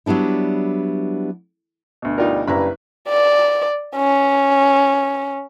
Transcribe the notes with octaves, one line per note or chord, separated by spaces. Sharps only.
F#3 G3 B3 D4 E4
D2 B2
G3 D#4 F4 A#4
F#1 G2 E4 B4 A#5 B5
D5
C#4